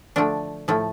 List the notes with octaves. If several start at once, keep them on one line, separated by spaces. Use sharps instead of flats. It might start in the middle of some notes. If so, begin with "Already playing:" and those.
D3 F3 A3 D4
A2 F3 A3